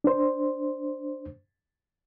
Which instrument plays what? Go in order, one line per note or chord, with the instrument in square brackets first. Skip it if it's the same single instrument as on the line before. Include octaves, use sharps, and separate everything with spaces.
[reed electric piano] D4 C5